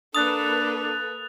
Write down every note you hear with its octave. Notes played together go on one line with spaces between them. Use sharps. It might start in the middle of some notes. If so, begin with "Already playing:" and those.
A#3 D4 A4 B4 D#6 F#6 A6 F7